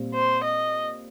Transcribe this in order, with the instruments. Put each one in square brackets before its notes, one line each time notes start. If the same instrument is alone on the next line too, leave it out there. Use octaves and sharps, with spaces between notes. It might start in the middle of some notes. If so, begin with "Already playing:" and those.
Already playing: [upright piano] A#2 G3 C4
[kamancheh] C5
D#5